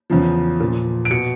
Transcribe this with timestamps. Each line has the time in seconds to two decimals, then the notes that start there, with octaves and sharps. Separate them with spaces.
0.10 E2 C#3 F3
0.60 A#2 F3
1.05 D7
1.10 B2 C#7